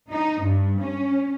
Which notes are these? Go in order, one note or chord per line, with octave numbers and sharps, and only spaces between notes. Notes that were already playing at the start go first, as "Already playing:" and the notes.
D#4
G2
C#4